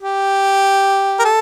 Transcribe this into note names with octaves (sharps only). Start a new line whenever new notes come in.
G4
A#4
A4